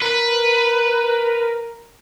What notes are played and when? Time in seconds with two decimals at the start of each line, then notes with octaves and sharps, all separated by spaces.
0.02 A#4 B4